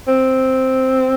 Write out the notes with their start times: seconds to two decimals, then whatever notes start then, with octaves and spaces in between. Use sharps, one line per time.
0.08 C4